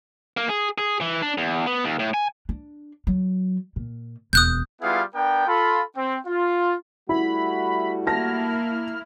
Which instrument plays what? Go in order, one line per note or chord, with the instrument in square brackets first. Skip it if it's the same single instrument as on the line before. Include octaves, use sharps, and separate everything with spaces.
[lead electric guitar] A#3
G#4
G#4
E3
D4
E2
B3
D#2
A2
G#5
[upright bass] D4
F#3
A#2
[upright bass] E1 D#2 [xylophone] D#6 F#6 G6
[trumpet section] G3 B3 E4 F4 G#4 F5
B3 D4 A#4 G5
F4 A4 B5
C4
F4
[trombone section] G3 A3 F#4 [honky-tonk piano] E4 [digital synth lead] B5
[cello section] A#3 E4 [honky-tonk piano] A5 A#6 [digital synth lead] F6